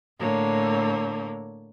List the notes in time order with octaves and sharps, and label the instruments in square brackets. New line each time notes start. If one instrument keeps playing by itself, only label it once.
[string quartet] A2 D3 A#3 C#5